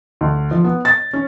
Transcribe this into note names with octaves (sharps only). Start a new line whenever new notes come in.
D2
F3
B3
A6
C#4